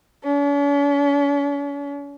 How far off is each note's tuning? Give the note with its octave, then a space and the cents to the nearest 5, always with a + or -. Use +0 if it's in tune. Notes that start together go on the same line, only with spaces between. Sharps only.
C#4 +45